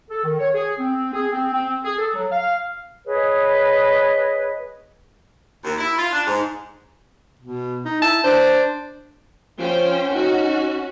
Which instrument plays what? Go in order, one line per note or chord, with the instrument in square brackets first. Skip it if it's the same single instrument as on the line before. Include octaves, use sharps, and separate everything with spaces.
[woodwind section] A4
D#3
C#5
G#4
C4
G#4
C4
C4
G#4
A4
F#3
F5
[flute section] G#4 B4 C#5 D#5
[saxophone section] D#2
E4
F4
D4
G#2
[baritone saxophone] B2
D#4
[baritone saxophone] E4 [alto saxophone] A5
[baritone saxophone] D4 [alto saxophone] C5
[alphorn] F3 [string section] C#4 C5 G5
[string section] C#4 F#4 [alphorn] D#4